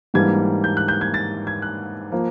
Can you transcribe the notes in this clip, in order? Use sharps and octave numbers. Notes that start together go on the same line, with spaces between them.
G#2 E3 G3 A#3 D4 G#6
G6
F#6
G6
G#6
A6
G#6
F#6
F3 A#3